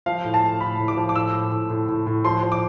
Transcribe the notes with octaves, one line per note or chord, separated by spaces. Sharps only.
F3 F5
A2
A5
A3
A2 B5
A2
D6
F3
D6
A2 E6
A2
A2
A2
A2
A2
F3 C6
F3
D6